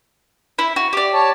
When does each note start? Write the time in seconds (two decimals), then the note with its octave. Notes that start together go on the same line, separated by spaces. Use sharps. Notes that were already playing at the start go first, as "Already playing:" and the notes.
0.59 E4
0.76 F#4
0.93 G4 D5
1.14 C#5 A5